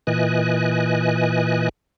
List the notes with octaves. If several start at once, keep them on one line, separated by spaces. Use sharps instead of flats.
A#2 E3 D#5 G#5 F#6